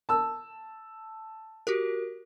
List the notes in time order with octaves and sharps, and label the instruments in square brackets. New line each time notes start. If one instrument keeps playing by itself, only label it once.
[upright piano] A5 E6
[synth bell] F#4 G4 A#4